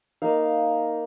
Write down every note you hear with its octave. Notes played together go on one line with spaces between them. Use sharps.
A#3 D#4 F5